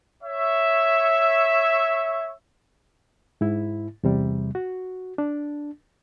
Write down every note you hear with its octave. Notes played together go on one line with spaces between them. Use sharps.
C#5 E5
G#2 E4
E2 C3 G3
F#4
D4